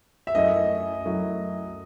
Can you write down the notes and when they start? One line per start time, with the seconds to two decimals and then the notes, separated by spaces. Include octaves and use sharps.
0.27 E5
0.35 F#2 F#3 A3 E4 D#5
1.05 F#2 F#3 A3 E4